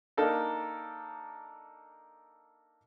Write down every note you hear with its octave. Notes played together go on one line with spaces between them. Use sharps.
A#3 D4 D#4 A4 A#4